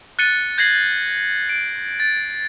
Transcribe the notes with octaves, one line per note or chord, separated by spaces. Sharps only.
F#6 A6 C#7 D#7 G7
G6 G#6 A#6 C7 F#7
D7
A6